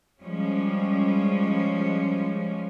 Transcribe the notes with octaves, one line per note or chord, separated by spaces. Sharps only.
F3 G3 G#3 C#4